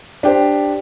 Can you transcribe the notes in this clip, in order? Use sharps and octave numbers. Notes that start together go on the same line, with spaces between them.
D4 G4 C5